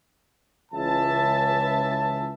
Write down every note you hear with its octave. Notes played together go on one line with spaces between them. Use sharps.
C#2 E3 E5 A5